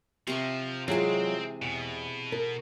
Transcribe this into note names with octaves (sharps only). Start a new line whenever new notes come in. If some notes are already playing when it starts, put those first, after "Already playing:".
C3 F3 C#6
E3 F#3 G#3 C4 F4 G#4
E2 B2
A#4